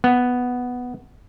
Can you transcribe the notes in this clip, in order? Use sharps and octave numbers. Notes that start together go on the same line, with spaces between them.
B3